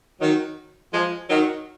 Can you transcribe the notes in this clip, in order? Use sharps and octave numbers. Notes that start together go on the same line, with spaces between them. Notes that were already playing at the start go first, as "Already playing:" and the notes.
D#3 F#3
F3 G#3
D#3 F#3